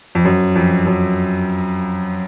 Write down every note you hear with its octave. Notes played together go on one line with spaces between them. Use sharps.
F2
F#2
F2
F#2